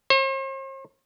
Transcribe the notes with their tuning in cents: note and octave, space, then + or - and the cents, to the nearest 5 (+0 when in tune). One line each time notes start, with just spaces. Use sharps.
C5 +45